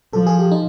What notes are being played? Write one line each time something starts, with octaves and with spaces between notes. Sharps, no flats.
F3 A4
G#4
G4
D#4